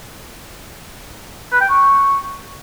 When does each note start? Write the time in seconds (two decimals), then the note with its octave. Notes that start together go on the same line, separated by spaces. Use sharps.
1.52 B4
1.61 G5
1.70 C#6